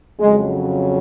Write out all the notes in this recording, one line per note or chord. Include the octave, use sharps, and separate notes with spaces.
F2 C#3 F#3 G#3